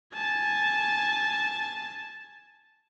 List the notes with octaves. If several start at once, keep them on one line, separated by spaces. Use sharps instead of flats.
G#5 A5